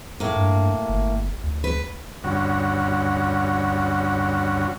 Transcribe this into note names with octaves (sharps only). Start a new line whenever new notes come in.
A2 A#3
G2
G1
D2
B4
D2 G2 C#4 F#4